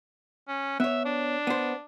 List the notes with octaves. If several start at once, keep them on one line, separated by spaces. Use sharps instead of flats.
C#4
B3 C#5 E5
D4
B3 C5